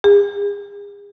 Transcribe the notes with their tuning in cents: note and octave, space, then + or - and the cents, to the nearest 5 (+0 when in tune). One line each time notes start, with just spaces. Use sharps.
G#4 -40